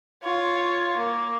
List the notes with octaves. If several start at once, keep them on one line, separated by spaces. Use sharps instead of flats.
F4 C#5
A#3